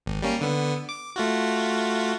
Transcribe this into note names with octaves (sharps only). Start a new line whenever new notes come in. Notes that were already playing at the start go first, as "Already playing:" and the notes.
G#1
G3 A#3 C#4
D3 B3
D6
A3 F4 F#4